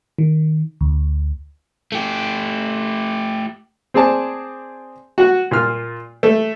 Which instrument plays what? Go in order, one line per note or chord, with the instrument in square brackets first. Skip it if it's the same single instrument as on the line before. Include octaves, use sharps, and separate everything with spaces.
[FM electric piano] D#3
D2
[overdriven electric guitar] A3 G4
[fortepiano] C4 G#4 D5 A5
F#4 F#5
A#2 F4 F6
A3